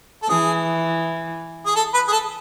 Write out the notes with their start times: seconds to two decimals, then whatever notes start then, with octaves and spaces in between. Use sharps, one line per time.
0.23 A4
0.29 E3 G#4
1.66 G#4
1.76 A4
1.94 B4
2.08 G#4
2.12 A4